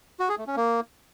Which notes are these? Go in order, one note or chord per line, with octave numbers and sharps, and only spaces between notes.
F#4
G#4
A3
C#4
A#3